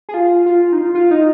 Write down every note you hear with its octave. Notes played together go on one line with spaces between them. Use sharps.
G#4
F4
F4
D#4
F4
F4
D#4